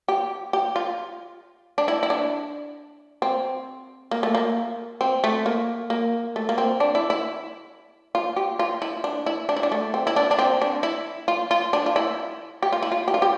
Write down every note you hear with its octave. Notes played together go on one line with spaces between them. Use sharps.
G4
G4
F4
D4
E4
E4
D4
C4
A#3
A3
A#3
C4
A3
A#3
A#3
A3
A#3
C4
D4
E4
E4
F4
G4
F4
E4
D4
E4
D4
E4
D4
A3
C4
E4
D4
D4
C4
D4
E4
F4
F4
D4
F4
E4
G4
F4
E4
F4
G4
F4
G4